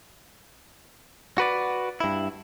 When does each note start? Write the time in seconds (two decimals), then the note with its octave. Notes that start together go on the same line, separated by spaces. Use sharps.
1.38 F#4 B4 D5
2.00 G2 E4